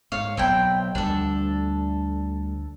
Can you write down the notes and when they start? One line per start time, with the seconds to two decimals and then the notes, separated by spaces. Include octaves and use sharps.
0.12 G#2 C#5 F5
0.37 B1 C4 E4 G5
0.95 D2 F3 G3 D4 A4